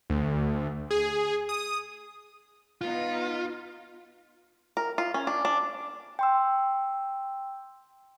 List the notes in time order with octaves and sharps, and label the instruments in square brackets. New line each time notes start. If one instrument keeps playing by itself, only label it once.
[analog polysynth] D2
G#4
D#6
[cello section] B3 D#4 [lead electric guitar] F4
[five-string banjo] A#4
F4
C#4
D4
D4
[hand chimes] G5 C6 E6